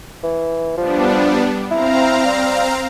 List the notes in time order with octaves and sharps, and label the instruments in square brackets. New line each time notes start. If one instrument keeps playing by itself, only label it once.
[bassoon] E3
[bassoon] F3 [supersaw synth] G3 B3 D4
[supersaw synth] C4 F5 A#5 [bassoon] E4
[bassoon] G3